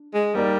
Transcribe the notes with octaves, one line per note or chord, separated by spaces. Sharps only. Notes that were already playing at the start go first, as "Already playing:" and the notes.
Already playing: D4
G#3
G3 A#3 D#4 A#4 D5